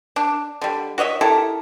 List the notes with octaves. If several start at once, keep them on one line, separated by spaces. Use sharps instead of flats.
D4
D3 G3
F#4 C#5 D#5 E5
E4 G4 A4 A#4